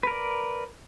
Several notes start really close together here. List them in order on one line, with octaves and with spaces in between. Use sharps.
B4 A#4 D5